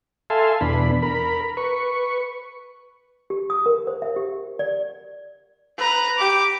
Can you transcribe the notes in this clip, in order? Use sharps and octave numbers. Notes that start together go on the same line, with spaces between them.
A4 E5 F5 G#5 A5 C6
E2 B2 D4 B5
A#4 B5
B4 C#6
G4
D#6
A#4
C5
E5
G4
D5
B4 A#5
G4 D6